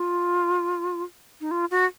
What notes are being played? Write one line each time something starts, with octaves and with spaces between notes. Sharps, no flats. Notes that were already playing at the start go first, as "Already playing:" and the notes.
Already playing: F4
D#4
F4
F#4